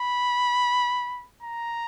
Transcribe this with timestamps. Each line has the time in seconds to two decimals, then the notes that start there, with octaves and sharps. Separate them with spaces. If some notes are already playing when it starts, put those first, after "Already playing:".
Already playing: B5
1.43 A#5